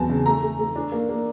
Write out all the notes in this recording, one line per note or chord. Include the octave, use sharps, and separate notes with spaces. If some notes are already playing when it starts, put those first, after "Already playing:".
Already playing: E2 F#3 C4 A5
C#3
A3 A#5
A3
A3
D4
A#3
A#3